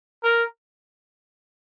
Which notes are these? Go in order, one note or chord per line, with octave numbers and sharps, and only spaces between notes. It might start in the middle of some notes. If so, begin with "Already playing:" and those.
A#4